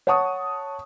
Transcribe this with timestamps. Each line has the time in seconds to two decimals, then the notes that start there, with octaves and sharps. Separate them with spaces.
0.07 C#5 F#5 A5 C#6 D#6